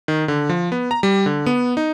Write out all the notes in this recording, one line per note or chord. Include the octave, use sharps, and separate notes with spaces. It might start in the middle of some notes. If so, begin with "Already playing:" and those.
D#3
D3
F3
B3
A#5
G3
D3
B3
D#4